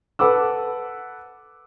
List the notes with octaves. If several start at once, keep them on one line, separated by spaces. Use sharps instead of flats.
A4 B4 F#5 D6 E6